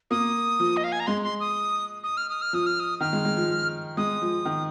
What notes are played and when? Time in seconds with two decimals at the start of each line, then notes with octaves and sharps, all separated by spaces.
0.11 A#3 D#6
0.60 F3
0.77 D#5
0.84 F5
0.92 G#5
1.00 A#5
1.07 G#3 C6
1.23 C6
1.40 D#6
2.04 D#6
2.17 F6
2.29 D#6
2.42 F6
2.53 F3 D#6
2.66 F6
2.80 D#6
3.00 D#3 F6
3.13 G#3
3.25 G#3
3.37 F3
3.97 G#3 D#6
4.22 F3
4.45 D#3